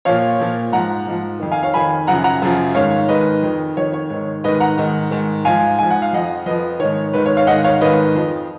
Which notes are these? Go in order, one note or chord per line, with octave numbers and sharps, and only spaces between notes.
A#2 F3 C#5 F5
A#2 F3
G#2 F3 F#5 A#5
G#2 F3
F2 D#3
F5 G#5
C#5 F5
F2 D#3 G#5 B5
F#2 C#3 F3 F#5 A#5
F#5 A#5
F#2 C#3 F3
G#2 D#3 C#5 F5
G#2 D#3 B4 D#5
F2 D#3
F2 D#3 C#5
C#5
G#2 D#3
G#2 D#3 B4 D#5
F#5 A#5
G#2 D#3
G#2 D#3
G#2 F3 F5 G#5
G#2 F3 G#5
F#5
F5
F2 F3 D#5 F#5
F2 F3 B4 D#5
G#2 D#3 C#5
G#2 D#3 B4
C#5
C#5 F5
G#2 D#3 D#5 F#5
C#5 F5
G#2 D#3 B4 D#5
F2 F3